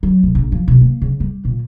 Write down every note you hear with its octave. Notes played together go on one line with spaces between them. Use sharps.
F#3
B1
A#1
F3
B2
A#3
C#3
G3
A#2